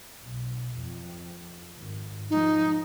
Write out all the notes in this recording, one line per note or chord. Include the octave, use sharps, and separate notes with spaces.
B1
F2
G#1
F3 G#3 D#4